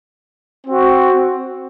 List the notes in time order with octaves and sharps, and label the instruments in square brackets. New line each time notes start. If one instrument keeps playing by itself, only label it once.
[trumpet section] C4 F#4